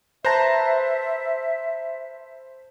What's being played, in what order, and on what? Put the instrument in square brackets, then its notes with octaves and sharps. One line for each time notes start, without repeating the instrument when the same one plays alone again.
[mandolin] B4 A#5 [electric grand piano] C5 A5 [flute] E5